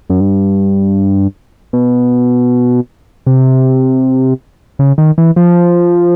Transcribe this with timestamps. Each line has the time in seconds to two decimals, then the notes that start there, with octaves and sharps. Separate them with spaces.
0.10 F#2
0.20 G2
1.73 B2
3.26 C3
4.79 C#3
4.98 D#3
5.18 E3
5.36 F3